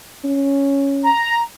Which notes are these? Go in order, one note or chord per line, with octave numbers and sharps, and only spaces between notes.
C#4
A#5